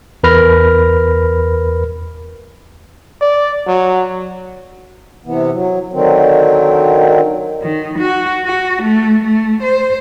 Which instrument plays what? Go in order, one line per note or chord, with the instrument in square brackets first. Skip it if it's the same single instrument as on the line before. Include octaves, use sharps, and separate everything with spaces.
[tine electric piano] E2 A#4 B4 B5 F6 A#6
[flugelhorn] D5
F#3
[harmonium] C3 E3 B3
F#3
D3 D#3 F#3 C4
[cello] D#3
F#4
F#4
A3
A3
C5